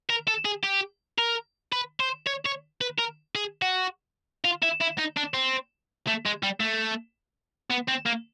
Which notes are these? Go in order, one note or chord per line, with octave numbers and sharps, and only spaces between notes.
A#4
A4
G#4
G4
A#4
B4
C5
C#5
C#5
B4
A#4
G#4
F#4
F4
E4
E4
D#4
D4
C4
A3
G#3
G3
A3
B3
C4
A#3